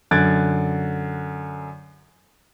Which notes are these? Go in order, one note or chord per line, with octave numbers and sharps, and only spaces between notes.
F#2 D3 F#6 G#6 A6 D7